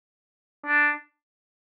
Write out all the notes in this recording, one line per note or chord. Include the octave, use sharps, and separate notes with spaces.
D4